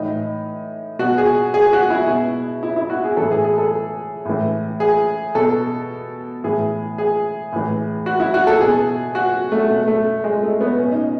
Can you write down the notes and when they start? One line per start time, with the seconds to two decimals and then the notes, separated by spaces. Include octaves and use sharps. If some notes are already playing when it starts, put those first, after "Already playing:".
Already playing: A2 E3 D#4
0.99 B2 F#4
1.18 G#4
1.54 G#4
1.73 F#4
1.90 E4
2.08 B2
2.63 E4
2.76 E4
2.90 F#4
3.04 G#4
3.17 A2 E3 A4
3.31 G#4
3.44 G#4
3.58 A4
4.25 A2 E3
4.80 G#4
5.35 B2 A4
6.44 A2 E3 G#4
6.98 G#4
7.53 A2 E3
8.06 F#4
8.20 E4
8.34 F#4
8.47 A4
8.61 B2 G#4
9.15 F#4
9.52 A3
9.69 B2 A3
9.88 A3
10.24 G#3
10.43 A3
10.61 B3
10.79 B2 C#4
10.92 D#4